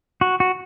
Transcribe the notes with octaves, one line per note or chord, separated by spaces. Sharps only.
F#4
F#4